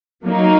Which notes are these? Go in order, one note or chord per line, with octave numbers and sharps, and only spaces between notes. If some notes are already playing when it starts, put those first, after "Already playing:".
F#3 A#3 D#4